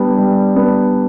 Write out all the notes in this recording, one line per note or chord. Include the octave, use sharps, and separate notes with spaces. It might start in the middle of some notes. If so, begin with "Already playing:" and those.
Already playing: G3 B3 D4
G3
B3 D4